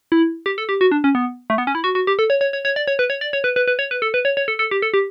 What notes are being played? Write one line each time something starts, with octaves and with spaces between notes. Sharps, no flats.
E4
G4
A4
G4
F#4
D4
C#4
B3
A3
B3
C#4
E4
F#4
F#4
G4
A4
C#5
C#5
C#5
C#5
D5
C#5
B4
C#5
D5
C#5
B4
B4
B4
C#5
B4
A4
B4
C#5
C#5
A4
A4
G4
A4
G4